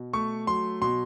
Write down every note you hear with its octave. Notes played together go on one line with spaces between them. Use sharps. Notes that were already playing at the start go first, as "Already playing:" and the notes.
Already playing: B2
A3 C#6
F#3 C6
B2 C6